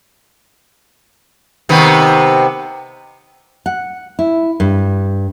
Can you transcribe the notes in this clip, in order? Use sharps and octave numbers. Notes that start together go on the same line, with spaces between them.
C3 D#3 B3
F#5
E4
G2